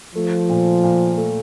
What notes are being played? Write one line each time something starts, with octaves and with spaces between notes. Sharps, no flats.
F3 A3
A#2
A#2
A3